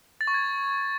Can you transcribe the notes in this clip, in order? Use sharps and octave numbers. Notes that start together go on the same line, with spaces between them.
A6
C#6
G#6